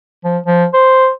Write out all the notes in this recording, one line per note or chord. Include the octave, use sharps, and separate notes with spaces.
F3
F3
C5